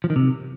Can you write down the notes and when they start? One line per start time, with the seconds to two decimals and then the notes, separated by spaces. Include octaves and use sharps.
0.04 F3
0.10 D#3
0.16 C3